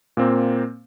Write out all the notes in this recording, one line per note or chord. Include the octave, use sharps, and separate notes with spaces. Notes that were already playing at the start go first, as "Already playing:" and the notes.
A#2 A#3 C4